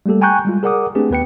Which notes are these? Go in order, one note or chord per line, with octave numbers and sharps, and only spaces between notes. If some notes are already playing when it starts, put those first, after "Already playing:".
G3 A3 A#3 G4 A4
G5 G#5 A#5 C#6 F#6 G6
G3 G#3 F4
G#4 A#4 D5 F#5 D6 D#6
A3 C4 D4 G4 G#4 B4
D#2 B3 B4 G5 C#7